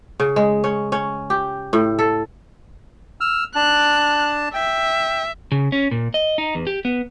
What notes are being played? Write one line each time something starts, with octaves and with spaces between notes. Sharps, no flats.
C#3
G#3
C#4
C#4
G4
A2
A4
E6 F6
D4 A5 F#6
E5 G5
C#3
C#4
A#2
D#5
D#4
E2
G4
B3